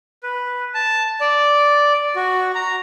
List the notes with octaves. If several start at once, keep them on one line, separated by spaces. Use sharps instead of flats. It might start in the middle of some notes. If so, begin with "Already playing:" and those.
B4
A5
D5
F#4
A#5